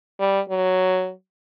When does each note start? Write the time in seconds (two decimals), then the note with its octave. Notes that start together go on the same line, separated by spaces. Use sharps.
0.19 G3
0.49 F#3